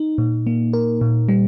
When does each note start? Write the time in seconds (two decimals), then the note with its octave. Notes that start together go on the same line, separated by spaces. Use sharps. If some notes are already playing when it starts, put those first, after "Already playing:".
Already playing: D#4
0.18 A#2
0.47 A#3
0.73 A#4
1.01 A#2
1.29 G3